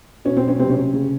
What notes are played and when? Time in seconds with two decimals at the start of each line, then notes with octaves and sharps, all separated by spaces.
0.25 B2 C#4
0.37 C4
0.42 F#3
0.48 C#4
0.59 C3 C4
0.70 C#4
0.77 C3
0.94 C#3